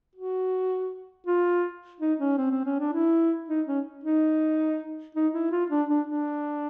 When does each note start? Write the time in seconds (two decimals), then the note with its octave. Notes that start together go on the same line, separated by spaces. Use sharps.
0.16 F#4
1.27 F4
2.01 D#4
2.20 C#4
2.38 C4
2.51 C4
2.65 C#4
2.79 D4
2.93 E4
3.49 D#4
3.67 C#4
4.04 D#4
5.15 D#4
5.33 E4
5.51 F4
5.70 D4
5.89 D4
6.07 D4